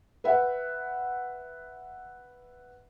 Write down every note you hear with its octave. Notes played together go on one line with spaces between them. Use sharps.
B4 E5 F#5